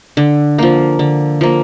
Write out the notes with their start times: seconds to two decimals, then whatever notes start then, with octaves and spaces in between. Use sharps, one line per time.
0.17 D3
0.58 F3 A#3
0.99 D3
1.41 F3 A#3